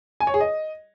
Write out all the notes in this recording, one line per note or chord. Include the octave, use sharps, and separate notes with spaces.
G#5
C#5
G#4
D#5